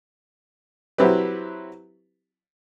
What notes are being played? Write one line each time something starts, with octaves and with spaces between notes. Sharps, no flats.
F#3 C4 E4 G4 B4